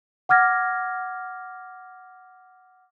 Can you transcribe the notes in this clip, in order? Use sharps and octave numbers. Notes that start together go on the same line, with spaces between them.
F#5 D6 F6 G#6 A#6